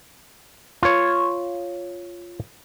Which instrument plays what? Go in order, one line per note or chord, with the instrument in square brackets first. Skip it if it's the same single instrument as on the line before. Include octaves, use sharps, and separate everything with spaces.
[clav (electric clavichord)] F4 C#5